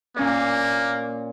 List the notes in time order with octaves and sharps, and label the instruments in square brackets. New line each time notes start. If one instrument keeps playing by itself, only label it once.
[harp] A#2 C#4 D5 [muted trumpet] A#3